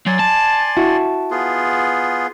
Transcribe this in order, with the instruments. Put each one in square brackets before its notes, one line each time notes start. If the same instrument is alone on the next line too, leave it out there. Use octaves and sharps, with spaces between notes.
[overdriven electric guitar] F#3 [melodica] D5 G#5 C6
[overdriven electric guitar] A5
[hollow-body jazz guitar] E4 F#4
[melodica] B3 F4 G#4